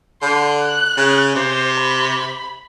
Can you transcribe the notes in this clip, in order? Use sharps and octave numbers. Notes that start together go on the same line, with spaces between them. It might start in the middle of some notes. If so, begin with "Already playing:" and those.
D3 C6
F#6
C#3
C3 C5
B5